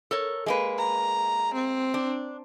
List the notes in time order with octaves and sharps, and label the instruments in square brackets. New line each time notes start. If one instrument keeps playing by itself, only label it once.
[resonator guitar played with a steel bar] A4 A#4 C#5
G#3 A#3 B4
[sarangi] A#5
C4
[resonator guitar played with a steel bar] D4